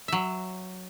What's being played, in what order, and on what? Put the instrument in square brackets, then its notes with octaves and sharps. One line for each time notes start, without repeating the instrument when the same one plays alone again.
[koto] F#3 E5